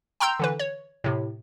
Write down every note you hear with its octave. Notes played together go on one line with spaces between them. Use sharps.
G5 A#5 C6 E6 G6
D3 E3 B4
C#5
A2 C3